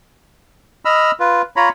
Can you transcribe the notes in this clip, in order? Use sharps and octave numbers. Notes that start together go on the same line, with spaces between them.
D#5 B5 E6 F6
F4 B4
F4 C#5 A#5 B5